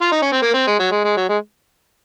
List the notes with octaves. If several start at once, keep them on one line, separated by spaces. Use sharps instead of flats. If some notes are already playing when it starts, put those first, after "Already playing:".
F4
D#4
C#4
C4
A#3
C4
G#3
F#3
G#3
G#3
F#3
G#3